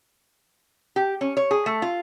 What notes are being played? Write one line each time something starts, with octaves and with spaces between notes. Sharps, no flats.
G4
C#4
C#5
G#4
A3
F4